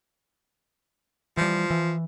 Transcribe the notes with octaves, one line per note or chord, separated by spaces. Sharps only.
E3 F3 G3
E3